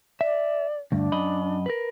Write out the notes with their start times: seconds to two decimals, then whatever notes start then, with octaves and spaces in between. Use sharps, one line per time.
0.21 D5 E5
0.92 D2 G2 D4
1.12 F#2 D#5 B5
1.66 A#4 B4